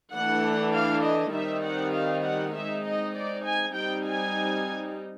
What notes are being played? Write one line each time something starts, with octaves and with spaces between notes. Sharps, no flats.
E3 A3 D4 F#5
F5
D#5
D#3 G3 C4 D#4 E5
F#5
F5
F#5
G#3 C4 D#4 E5
D#5
D5
G#5
G3 C4 D#4 G5
G#5